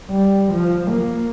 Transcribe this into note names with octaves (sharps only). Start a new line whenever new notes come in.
G3
F3
A#3